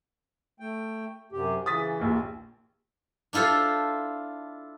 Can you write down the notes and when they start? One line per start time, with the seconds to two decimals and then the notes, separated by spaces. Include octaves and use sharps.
0.60 A3 G5
1.32 F#2 C3 G4
1.66 C#3 E3 D#6 A6 B6
2.00 A#1 D#2
3.33 D4 E4 F4 A4 C5